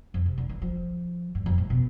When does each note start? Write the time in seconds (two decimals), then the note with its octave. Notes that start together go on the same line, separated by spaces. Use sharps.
0.14 F2
0.26 C3
0.38 D3
0.49 E3
0.62 F3
1.35 G2
1.46 F2
1.58 A2
1.70 B2